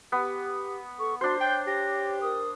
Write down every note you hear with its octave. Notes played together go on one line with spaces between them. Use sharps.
B3 G4
A4 C#6
D4 F#4 C5 C6
C#5 G5 G6
G4 A#6
A#4 D#6